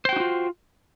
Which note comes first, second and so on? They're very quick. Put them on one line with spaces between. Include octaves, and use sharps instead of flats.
C5 G5 F#4 D#4 F4